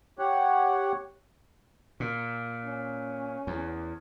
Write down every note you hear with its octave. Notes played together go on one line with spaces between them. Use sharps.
G4 C#5 F#5
A#2
C#4
E2